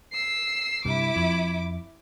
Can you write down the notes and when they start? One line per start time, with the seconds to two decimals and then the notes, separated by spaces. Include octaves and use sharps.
0.13 E6 C7
0.85 C2 G2 E4 D6
1.16 F2